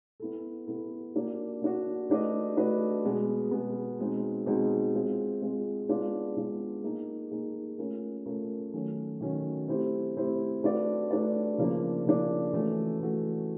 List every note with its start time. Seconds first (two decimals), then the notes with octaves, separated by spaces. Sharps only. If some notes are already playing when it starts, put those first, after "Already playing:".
0.20 B3 E4 A4
0.67 B3 E4 A4
1.15 A#3 D4 F#4
1.62 A#3 D4 F#4
2.10 A3 D4 F#4 B4 D#5
2.57 A3 D4 F#4 B4 D#5
3.04 B2 G#3 B3
3.51 B2 G#3 B3
3.99 B2 G#3 C4 D#4
4.46 B2 G#3 C4 D#4
4.94 G#3 C4 F4
5.41 G#3 C4 F4
5.89 G#3 B3 D4 F4
6.36 G#3 B3 D4 F4
6.84 A#3 D#4 G#4
7.31 A#3 D#4 G#4
7.78 A3 C#4 F4 A#4
8.26 A3 C#4 F4 A#4
8.73 D#3 F#3 A3 C#4 F#4
9.21 D#3 F#3 A3 C#4 F#4
9.68 A3 C4 E4 G4 C5
10.16 A3 C4 E4 G4 C5
10.63 A3 D4 F#4 B4 D5
11.11 A3 D4 F#4 B4 D5
11.58 C#3 F3 A#3 D4
12.06 C#3 F3 A#3 D4
12.53 E3 A3 C#4 F#4 A4
13.00 E3 A3 C#4 F#4 A4